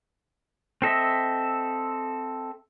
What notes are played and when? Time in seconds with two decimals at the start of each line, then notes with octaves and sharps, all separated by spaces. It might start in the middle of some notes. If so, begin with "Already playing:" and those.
0.82 C4 A4 D#5 E5